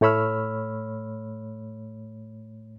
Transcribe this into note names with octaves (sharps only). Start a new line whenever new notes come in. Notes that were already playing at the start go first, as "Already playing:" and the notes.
A2 A3 C#5 B5 E6 F6